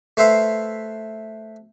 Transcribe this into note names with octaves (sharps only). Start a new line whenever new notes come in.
A3 B4 C5 E5 F5